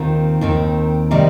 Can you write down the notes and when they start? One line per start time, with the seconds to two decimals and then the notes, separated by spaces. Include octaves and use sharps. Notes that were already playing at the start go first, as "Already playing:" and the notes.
Already playing: D#2 D#3 C4 F4
0.41 D#2 D#3 C4
1.11 C3 D#3 G3 D#4